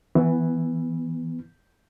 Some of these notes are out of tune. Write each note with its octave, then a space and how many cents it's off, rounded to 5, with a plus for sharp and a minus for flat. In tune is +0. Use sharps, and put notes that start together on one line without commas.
E3 +0 B3 +0